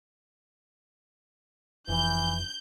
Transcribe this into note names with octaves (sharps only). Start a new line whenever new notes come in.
F1 E3 G6